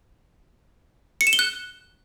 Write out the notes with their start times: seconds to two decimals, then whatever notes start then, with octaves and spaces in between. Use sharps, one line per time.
1.21 C#7
1.27 E7
1.33 G7
1.39 F#6